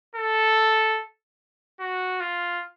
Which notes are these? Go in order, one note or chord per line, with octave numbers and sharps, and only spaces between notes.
A4
F#4
F4